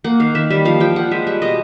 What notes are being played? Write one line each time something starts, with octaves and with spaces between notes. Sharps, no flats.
A#3 F#5
D#3 F5
D#3 E5
G3 E5
F3 F5
F3 G5
F3 F#5
G#3 E5
G3 E5
B2 D#5